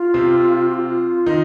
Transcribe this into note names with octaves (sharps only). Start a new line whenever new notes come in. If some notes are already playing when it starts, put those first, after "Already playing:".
Already playing: F4
C3 C4
G4
F4
D#3 D#4